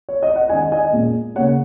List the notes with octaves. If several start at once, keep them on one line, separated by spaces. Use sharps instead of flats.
C#5
D#5
F#5
D#3 G#3 C#4 D#5 G#5
D#5 G#5
A#2 G#3 C#4
C#3 A#3 C#4 C#5 F#5